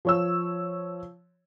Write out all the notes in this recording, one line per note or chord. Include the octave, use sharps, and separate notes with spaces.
F3 C#5 E6